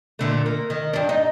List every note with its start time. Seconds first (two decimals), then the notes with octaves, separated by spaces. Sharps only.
0.19 A#2 D3 A3
0.46 A#3
0.70 D#3
0.93 G2 D4
1.09 D#4